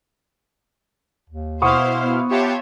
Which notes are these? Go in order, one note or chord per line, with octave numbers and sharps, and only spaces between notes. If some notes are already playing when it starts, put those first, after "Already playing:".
D#2
B2 E4 C5 F5 F#5 C#6 D#6
B3
F4 G4 C#5 E5 F#5 A5